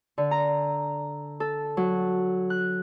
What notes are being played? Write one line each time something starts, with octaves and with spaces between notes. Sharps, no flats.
D3
A#5
A4
F#3
F#6